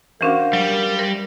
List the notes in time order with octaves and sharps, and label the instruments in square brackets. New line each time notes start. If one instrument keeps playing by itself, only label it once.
[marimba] E3 C#4 D4 [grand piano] F#4 C5 F5 [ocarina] A#4
[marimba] F#3 [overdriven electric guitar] G3
[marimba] A#4